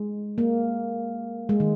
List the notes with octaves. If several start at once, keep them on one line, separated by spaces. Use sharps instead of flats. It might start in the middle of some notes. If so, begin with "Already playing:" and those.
Already playing: G#3
A#3
G#3
D#3